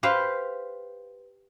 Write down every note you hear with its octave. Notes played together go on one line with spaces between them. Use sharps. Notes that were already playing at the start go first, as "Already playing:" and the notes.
G4 B4 C5 F5